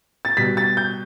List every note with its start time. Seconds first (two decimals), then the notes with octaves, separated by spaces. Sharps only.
0.25 A6
0.37 B2 G3 B6
0.57 A6
0.77 G6